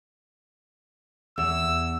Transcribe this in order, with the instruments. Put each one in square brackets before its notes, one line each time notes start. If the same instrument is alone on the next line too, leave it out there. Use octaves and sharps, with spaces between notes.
[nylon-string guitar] E2 [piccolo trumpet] E6